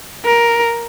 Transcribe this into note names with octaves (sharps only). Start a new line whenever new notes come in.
A#4